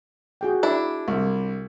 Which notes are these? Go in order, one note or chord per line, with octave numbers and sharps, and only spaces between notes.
F#4 G#4 G5
D4 E4
C2